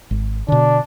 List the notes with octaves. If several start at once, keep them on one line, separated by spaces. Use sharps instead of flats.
G#1
B2 D3 D4